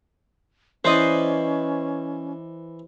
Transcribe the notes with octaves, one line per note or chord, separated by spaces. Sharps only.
E3 C#4 B4 C5 D5 D#5